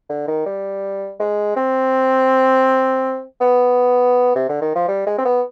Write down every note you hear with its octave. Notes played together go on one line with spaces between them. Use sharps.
D3
D#3
G3
G#3
C4
B3
C3
D3
D#3
F3
G3
G#3
C4
B3